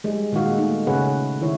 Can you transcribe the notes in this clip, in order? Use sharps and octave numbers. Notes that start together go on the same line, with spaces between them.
G3 G#3
A#2 D#3 G#3 D#4 F#4 F5
A3 D#4
C#3 C#4 G#4 B4 C#5 F#5
D#3 E4 C#5